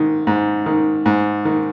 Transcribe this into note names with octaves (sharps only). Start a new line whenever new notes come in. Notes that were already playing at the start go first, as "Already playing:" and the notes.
Already playing: G#2 D#3
G#2
D#3
G#2
D#3